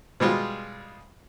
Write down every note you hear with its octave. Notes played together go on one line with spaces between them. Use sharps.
B2 G3 G#3 F4